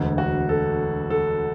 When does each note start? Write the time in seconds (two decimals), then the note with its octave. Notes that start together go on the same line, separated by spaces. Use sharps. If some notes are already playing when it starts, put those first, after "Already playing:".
Already playing: E1 D2 D3
0.18 F#4
0.49 A4
1.10 A4